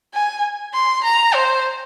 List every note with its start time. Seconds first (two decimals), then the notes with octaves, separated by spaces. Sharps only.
0.14 G#5
0.74 C6
1.04 A#5
1.34 C5